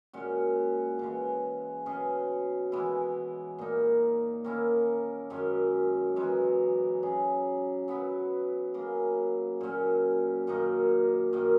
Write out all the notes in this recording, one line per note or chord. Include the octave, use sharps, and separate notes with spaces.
A#2 G#3 C#4 F#4
C#3 E3 G#3
B2 F#3 C#4 G#4
E3 G#3 B3 E4
A#2 A#3 D#4
D#3 A#3 C#4 E4
F#2 D#3 G#3 C#4
F#2 E3 G#3 D#4
C#3 F#3 C#4 G#4
F#3 B3 E4 B4
C#3 F#3 A#3
A#2 F#3 C#4
F#2 D#3 A#3 D#4
F#2 D#3 A#3